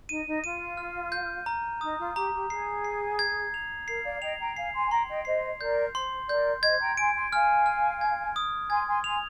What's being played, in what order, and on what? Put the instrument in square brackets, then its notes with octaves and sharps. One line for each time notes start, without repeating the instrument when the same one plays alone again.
[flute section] D#4 [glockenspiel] D#7
[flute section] D#4
[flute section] F4 [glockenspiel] D#7
[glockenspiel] F6
G6
A#5
[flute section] D#4 [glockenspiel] D#6
[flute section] F4
[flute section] G4 [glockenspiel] A#5
[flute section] G4
[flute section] G#4 [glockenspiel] C7
[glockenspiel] C7
G#6
F7
[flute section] A#4 [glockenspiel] C7
[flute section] D5 F5
[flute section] D#5 G5 [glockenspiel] F7
[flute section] G5 A#5
[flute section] F5 G#5 [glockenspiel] C7
[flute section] G#5 C6
G#5
[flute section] G5 A#5 [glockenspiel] C6
[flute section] D#5 G5
[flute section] C5 D#5 [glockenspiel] C7
[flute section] A#4 D5 [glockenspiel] G6
[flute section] C5 [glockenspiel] C6
[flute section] A#4 D5 [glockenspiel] G6
[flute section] C5 D#5 [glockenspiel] G#6
[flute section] G5 A#5
[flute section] G#5 C6 [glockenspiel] D7
[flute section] G#5 C6
[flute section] F5 G#5 [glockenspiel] F6
[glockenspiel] F6
G#6
D#6
[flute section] G#5 C6 [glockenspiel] G#6
[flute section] G#5 C6
[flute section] G#5 C6 [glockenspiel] F7